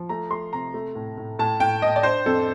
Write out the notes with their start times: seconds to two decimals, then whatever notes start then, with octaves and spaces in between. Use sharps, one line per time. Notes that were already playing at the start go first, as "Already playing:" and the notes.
Already playing: F3
0.09 A3 A#5
0.30 A3 C6
0.53 C3 A#5
0.74 A3
0.95 A2
1.17 A2
1.39 A2 A5
1.60 A2 G5
1.82 A2 D#5
1.96 D5
2.03 D4 C5
2.26 F2 A4